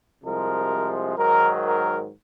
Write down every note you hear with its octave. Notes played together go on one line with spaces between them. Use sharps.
C2 C3 F3 G#3 A#4
G#2 D#3 F#3 A#4
A#4